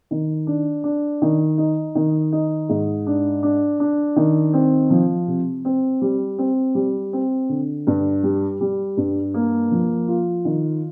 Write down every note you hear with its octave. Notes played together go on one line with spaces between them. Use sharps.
D#3
D4
D4
D#3
D#4
D#3
D#4
G#2
D4
D4
D4
D#3
C4
F3
C3
C4
G3
C4
G3
C4
D3
G2
G3
G3
G2
A#3
F3
F4
D#3